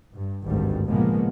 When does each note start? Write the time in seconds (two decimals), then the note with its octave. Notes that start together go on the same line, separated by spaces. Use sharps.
0.14 G2
0.46 G#1 D2 G2 G3
0.88 A#2 C#3 F3 G#3 A#3 B3